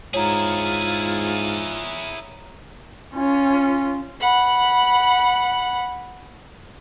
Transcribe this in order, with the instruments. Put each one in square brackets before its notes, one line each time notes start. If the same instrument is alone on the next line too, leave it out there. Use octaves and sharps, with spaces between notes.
[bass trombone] G#2 [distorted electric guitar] E4 G#4 [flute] F4 [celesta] C#5 A#5
[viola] C#4 F4
[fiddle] F#5 B5